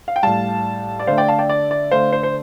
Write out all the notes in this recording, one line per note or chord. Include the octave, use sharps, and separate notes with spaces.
F5
G5
A2 G3 F5 A5
D5
D3 A3 C5 F5
D5 G5
F5 A5
D5 G5
D5
D5
D3 A3 C5 F5
C5
C5